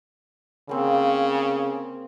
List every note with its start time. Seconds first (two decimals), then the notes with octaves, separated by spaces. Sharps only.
0.69 C#3 A#3 C4